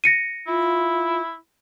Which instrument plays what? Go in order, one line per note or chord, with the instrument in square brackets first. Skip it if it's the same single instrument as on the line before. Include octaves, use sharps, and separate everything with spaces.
[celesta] A#6 C#7 D#7
[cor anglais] E4 [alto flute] F4